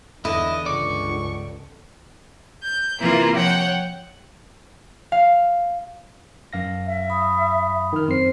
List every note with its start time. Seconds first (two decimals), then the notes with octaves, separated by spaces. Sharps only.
0.25 E2 D3 E4 D#5
0.66 C#2 G2 D5 C#6
2.61 G6
3.00 C3 E3 A#3 E4 F4 A#4
3.34 F3 C#5 F#5 G5
5.12 F5
6.53 F#2 F5 A#6
6.87 E5
7.10 B5 D#6
7.93 D#3 F6
8.08 F#2 C4 C5 C7